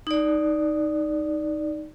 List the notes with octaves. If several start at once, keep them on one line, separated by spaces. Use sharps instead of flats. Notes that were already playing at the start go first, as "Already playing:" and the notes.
D#4 D5